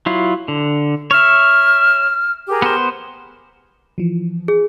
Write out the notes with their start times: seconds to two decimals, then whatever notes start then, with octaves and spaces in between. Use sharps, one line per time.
0.06 F#3 E4 F4
0.48 D3
1.11 C#5 E5 F6
2.48 G4 G#4 A#4
2.62 B3 C5
3.98 E3 F3
4.48 G#4